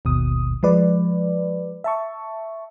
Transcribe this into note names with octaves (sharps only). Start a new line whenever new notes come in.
G#1 D#2 B2 D#6
F3 G#3 B4 D5
E5 A5 C#6